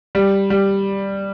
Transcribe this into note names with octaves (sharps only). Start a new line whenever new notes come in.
G3
G3